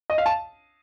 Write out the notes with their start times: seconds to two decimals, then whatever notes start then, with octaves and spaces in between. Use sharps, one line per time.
0.10 D#5
0.18 F5
0.26 A5